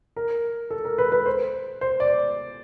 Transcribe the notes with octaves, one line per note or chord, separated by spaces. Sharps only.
A#4
A4
A#4
B4
B4
C5
C5
D5